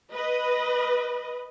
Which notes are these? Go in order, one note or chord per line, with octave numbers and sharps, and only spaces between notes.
B4 D#5